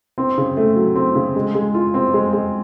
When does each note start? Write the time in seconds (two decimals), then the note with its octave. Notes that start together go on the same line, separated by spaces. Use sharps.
0.18 C4
0.38 C#3
0.57 A3
0.76 F#3
0.96 C4
1.15 C#3
1.36 G#3
1.55 G#3
1.74 F4
1.94 C4
2.14 G#3
2.33 G#3